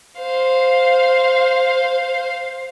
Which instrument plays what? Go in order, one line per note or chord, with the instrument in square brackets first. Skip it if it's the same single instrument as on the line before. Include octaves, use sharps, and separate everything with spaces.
[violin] C5 F5